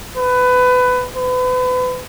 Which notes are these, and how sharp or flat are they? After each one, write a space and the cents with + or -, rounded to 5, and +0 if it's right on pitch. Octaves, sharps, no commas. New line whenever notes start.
B4 +20
B4 +35